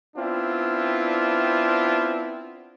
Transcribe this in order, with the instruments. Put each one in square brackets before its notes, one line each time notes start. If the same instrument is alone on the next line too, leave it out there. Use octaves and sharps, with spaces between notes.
[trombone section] B3 C4 D4 E4 F4